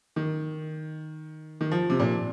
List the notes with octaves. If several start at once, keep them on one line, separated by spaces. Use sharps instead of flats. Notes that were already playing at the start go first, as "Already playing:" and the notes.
D#3
D#3
F3
C3
A#2